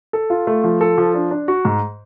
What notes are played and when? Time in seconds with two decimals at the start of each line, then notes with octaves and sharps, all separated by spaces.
0.13 A4
0.30 F4
0.47 A3
0.64 F3
0.81 A4
0.98 F3
1.15 D4
1.31 D4
1.48 F#4
1.65 G#2